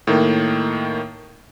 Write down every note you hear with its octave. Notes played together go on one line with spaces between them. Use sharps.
A2 D#3 A#3